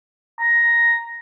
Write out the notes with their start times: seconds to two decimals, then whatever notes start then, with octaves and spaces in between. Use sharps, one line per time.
0.39 A#5